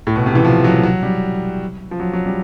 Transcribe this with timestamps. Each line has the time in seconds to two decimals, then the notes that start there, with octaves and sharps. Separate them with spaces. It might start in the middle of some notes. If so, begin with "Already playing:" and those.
0.07 A2
0.16 B2
0.26 C3
0.35 E3
0.45 F3
0.64 F#3
0.83 F#3
1.03 G3
1.91 F3
2.00 F#3
2.13 F#3
2.26 G3